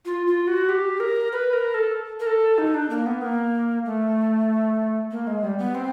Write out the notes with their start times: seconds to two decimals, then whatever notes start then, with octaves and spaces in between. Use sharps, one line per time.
0.06 F4
0.27 F4
0.47 F#4
0.69 G4
1.00 A#4
1.32 B4
1.53 A#4
1.74 A4
2.20 A#4
2.27 A4
2.58 D#4
2.74 D4
2.90 A#3
3.06 B3
3.22 A#3
3.85 A3
5.11 A#3
5.27 G#3
5.43 G3
5.59 B3
5.75 C4